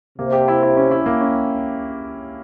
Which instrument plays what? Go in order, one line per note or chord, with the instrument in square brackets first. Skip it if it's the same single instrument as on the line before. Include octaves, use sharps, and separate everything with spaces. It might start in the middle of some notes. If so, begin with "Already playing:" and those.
[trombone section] C3 [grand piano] A#3
[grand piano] G4
E4
E4
C#4
E4
A#3
C#4